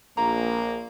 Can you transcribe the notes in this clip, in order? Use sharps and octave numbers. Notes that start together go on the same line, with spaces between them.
A#1 A#3 A#5